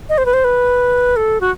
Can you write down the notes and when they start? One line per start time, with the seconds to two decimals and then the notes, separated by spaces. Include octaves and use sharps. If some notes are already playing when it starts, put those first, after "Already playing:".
0.09 D#5
0.18 C5
0.26 B4
0.33 C5
0.44 B4
1.16 A4
1.41 F#4